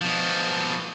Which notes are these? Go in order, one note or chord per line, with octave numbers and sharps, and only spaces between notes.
B2 F3